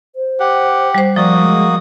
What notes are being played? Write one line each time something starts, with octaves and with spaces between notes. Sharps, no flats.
C5
G4 F#5
G3 C5
F3 A#3 F#4 D5 D#6
G#3